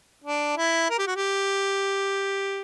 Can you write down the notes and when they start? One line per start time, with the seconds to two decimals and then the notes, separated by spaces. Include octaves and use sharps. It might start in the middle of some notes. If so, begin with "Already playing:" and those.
0.24 D4
0.57 E4
0.90 A#4
0.98 G4
1.07 F#4
1.16 G4